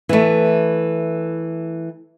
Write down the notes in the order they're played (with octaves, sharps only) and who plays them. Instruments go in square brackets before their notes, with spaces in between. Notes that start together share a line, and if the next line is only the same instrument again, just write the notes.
[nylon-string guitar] E3 A3